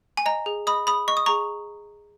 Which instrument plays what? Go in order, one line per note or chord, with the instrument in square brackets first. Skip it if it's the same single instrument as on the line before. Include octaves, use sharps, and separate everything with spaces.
[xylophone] G#5
D#5 A#5
G#4
D#5 B5 D#6
G#4 B5 D#6
D#5 C#6
D#6
G#4 A#5 C#6